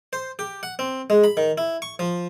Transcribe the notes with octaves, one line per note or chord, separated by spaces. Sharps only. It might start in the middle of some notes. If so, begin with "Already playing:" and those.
C5
G4
F#5
C4
G#3
B5
D#3
E4
C#6
F3